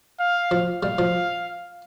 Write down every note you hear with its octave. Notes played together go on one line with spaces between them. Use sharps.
F5
F3
G3 F5
F3